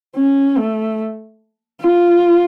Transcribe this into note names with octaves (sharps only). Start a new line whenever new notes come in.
C#4
A3
F4